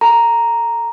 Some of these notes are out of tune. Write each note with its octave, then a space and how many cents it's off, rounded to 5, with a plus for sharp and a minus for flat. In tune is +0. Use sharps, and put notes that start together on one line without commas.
A4 +0 A#5 +0